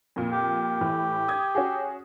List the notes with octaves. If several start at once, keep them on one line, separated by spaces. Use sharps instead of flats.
F2 A#2
G4
A2 E3
D#6 G#6
C#4 F#4 G#4